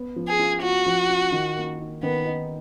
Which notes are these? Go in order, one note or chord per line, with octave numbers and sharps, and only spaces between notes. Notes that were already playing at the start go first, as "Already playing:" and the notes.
Already playing: B3
F3
G#4
F4
F4 F#4
F3
F4
D#3
A#3
D#4
D#3 B3
D#4